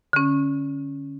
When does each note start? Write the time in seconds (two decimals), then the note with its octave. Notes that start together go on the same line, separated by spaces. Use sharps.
0.13 D3 C#4